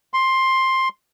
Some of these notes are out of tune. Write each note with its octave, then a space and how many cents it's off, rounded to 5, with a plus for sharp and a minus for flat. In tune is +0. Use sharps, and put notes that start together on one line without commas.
C6 +10